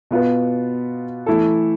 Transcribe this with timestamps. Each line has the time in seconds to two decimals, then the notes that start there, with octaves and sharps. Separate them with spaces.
0.11 B2 B3 F4 B4
1.26 E3 A3 E4 A4